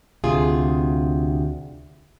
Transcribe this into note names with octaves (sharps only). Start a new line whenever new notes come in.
D2 C3 F4 G#4